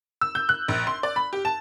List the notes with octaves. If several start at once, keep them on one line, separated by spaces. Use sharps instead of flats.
E6
G6
F#6
A#1
C6
D5
B5
G4
A5